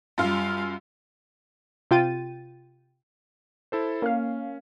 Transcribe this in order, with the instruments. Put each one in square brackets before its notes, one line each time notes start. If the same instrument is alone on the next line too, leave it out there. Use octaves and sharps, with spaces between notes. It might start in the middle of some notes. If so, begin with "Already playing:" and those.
[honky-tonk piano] F#2 F4 [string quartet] G3 F5
[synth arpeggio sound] C3 F4 G5 A6 D#7
[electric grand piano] E4 A4 C5
[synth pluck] A#3 F5 [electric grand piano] C#4